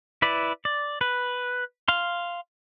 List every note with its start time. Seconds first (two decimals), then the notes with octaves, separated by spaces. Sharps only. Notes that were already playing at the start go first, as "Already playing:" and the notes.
0.22 E4 B4 D5
0.65 D5
1.01 B4
1.88 F5 C6